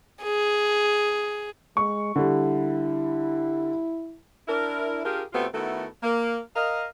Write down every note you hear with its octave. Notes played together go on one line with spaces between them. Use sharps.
G#4
G#3 C#6
D3 G3 E4
D4 E4 A#4
D4 F4 G4 G#4 A#4
B2 A3 B3 C4 F4 G4
D#3 A3 B3 E4 F#4 A4
A#3
A#4 D#5 F5